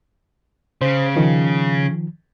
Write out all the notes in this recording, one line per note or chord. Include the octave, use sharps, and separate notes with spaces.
C#3 C5
D#3 F3